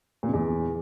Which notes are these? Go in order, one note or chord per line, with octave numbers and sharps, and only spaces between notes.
A#2
C#3
E2